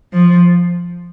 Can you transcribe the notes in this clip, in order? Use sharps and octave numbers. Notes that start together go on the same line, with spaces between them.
F3